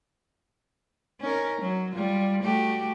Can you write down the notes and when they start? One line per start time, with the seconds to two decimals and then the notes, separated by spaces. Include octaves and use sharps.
1.21 C#4 D#4 A#4
1.61 F#3
1.92 G3 F4
2.43 A3 F#4 G4